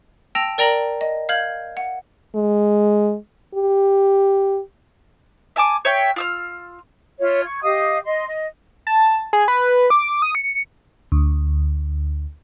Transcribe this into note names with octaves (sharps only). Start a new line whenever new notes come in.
G5 A5 E6 A#6 F7
A#4 D5 G5 A#5 A#6 F#7
D#5
F5 F6 G6 G#6 F#7
F#5
G#3
G4
E5 G#5 A5 D6
C#5 E5 G5
F4 E6 F6
F4 C#5 E5
C#6 G#6
G4 D#5 F5 D#6
D#5 C6
D#5
A5
G#4
B4
D6
D#6
C#7
D2